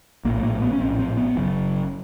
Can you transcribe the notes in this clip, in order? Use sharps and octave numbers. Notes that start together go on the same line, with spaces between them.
A#1 A2 A#3
A#3
B3
C#4
A#1 A2 C4
C4
B3
F#1 F#2 C#3